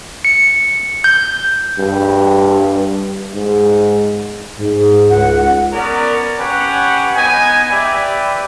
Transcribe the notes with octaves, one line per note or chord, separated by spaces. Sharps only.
C#7
G6
G2
G#2
G#2
C#2 F#5
B3 C#4 A#4 D5
C#4 G4 B4 F#5
B3 D#4 G#5
G4 B4 D5 E5